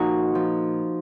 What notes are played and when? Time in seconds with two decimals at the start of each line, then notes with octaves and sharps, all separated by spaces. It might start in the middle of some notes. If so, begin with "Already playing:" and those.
Already playing: A#2 F3 D#4 F#4
0.35 F3